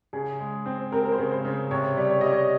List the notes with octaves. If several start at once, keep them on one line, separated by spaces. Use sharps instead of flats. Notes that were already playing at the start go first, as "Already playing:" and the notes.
C#3 G#4
G#3
C4
C4 A#4
A#4
C5
C#3
C5
C#3
C3 C#5
G3
C#5
G3 D#5
C#5